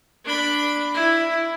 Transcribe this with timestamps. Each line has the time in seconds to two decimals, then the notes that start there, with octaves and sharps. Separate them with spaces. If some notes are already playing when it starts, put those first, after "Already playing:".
0.25 D4 B5
0.94 E4